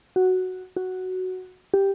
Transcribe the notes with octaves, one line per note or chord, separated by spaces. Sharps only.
F#4
F#4
G4